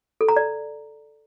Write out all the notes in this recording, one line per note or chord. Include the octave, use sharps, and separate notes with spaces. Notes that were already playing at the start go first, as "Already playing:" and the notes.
A4
A#5
D5